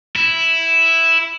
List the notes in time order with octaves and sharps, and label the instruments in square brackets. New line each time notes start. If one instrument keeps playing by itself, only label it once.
[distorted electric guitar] E4